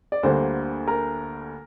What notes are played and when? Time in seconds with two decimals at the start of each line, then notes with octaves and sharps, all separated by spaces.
0.12 D5
0.23 D2 D3 G3 A#3 C5
0.88 A#4